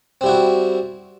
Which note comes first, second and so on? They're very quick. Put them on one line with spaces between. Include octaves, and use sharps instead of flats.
C4 G3 E4 F#4